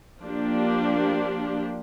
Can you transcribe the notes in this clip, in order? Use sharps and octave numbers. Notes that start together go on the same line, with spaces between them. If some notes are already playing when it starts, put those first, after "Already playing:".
F3 A#3 D4 G4